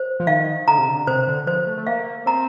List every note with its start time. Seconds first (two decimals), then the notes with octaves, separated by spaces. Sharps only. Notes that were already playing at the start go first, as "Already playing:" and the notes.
Already playing: C5
0.20 F3
0.27 D#3 F5
0.68 D3 A#5
0.78 C3
0.88 D3
1.07 C3 C5
1.28 D3
1.46 F3 C5
1.67 A3
1.78 A3
1.87 A#3 F5
2.26 C4 A#5